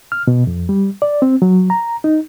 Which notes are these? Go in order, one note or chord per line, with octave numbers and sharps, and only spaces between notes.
F6
B2
F2
G3
D5
C4
F#3
A#5
D#4